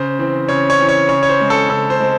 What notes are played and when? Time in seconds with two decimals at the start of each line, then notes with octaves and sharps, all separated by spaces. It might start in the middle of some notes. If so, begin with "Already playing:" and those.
Already playing: C#3 C5
0.19 E3 C4
0.49 C#3 C#5
0.70 C#5
0.79 E3 C4
0.89 C#5
1.09 C#3 C#5
1.23 C#5
1.29 C5
1.40 G#3 C4
1.50 A4
1.69 C#3 A4
1.90 C5
2.00 G#3 C4